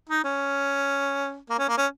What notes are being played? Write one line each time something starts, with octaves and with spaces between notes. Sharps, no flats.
D#4
C#4
A#3
C#4
A#3
C#4